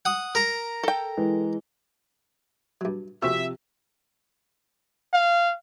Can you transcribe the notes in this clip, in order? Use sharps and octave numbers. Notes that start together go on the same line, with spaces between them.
F#5 D#6
A#4 A#5
A4 G5
E3 G#3
G2 F#3
C3 F3 C4 C#4 F#4 E5 E6
F5